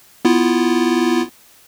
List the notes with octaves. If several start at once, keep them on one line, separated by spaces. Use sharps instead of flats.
B3 E4 F4